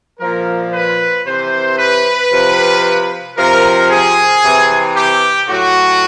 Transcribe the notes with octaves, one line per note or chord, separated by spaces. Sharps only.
A#2 F3 A#4
B4
C3 E3 C5
B4
C3 F3
C3 F3 A#4
G#4
C3 E3
G4
A2 F#3 F#4